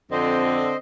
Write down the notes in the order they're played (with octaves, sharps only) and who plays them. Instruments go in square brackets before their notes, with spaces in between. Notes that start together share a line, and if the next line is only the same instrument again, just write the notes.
[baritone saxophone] F2 [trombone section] D3 [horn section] C4 [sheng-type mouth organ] C5 D#5